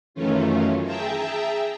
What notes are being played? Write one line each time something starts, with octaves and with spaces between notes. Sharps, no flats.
F#2 D#3 E3 A3 C#4 F4
G#4 E5 G5 A5 A#5